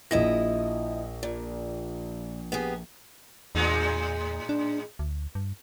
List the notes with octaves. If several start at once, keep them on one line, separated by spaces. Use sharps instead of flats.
A#1 F3 E4 D#5 A#6
A#2
B3 G4 G#4
E2 A2 G#3 D#4
D4
D2
G2